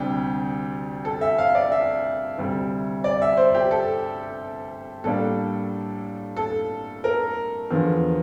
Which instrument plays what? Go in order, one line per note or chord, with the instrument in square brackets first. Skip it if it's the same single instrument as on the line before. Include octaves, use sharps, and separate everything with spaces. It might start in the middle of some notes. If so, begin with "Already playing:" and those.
Already playing: [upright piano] D2 C3 G3 D4 G4
A4
E5
F5
D5
E5
D2 C3 G3
D5
E5
C5
G4
A4
A2 G3 A#3 D4 A4
A4
A#4
E2 D3 F3